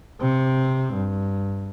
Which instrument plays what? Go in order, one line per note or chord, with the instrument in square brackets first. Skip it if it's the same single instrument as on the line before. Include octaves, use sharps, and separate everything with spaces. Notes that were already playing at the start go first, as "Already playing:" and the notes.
[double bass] C3 C4
G2